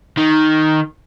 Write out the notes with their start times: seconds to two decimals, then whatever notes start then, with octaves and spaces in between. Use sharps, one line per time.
0.17 D#3